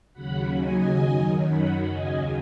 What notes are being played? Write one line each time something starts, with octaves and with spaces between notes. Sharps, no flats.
D#2 C#3 F#3 F#5 B5
D#5 G#5
F#2 D#3 F#3
F#5 B5
D#2 C#3 F#3 D#5 G#5